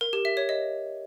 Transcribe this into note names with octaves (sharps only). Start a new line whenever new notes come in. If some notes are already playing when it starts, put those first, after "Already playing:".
A#4
G4
E5
C#5
D#5